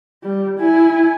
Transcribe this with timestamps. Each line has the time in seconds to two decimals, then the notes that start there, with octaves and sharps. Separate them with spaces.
0.23 G3
0.59 E4 G#5